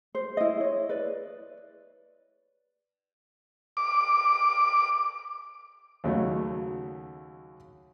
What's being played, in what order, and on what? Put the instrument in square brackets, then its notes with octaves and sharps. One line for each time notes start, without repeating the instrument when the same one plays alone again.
[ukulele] C5
E4 D#5
C#5
B4 D5
[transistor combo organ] D6
[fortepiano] D#2 C#3 F#3 A3